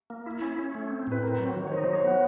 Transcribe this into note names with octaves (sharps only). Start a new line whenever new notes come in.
A#3
E4
C#4
C#4
A3
C4
A2 B4
C4 A#4
F#3
D#3
C#5
D#4 C5
F#3 C5
C#5
B3 F#5